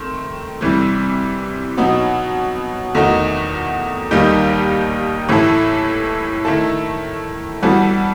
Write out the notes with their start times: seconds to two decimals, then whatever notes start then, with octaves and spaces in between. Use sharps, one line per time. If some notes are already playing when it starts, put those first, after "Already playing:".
Already playing: D#3 A3 C4
0.61 C3 E3 G3
1.77 B2 F#3 B3 D#4
2.95 E2 D#3 A3 D#4 F#4
4.11 D#2 D#3 G3 D#4 G4
5.28 A2 E3 A3 E4 A4
6.45 D#3 A3 E4 A4
7.63 E3 G3 B3 F#4 A4